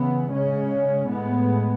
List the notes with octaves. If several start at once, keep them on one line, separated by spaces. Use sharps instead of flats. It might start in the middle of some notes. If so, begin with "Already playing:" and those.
Already playing: C#3 E3 B3
C#3 G#3 C#4
A2 G#3 B3